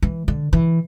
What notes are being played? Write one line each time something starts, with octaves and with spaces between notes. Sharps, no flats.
E3
D3
E3